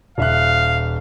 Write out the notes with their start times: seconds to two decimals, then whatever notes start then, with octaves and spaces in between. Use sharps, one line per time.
0.18 D#1 E5 F5 F#6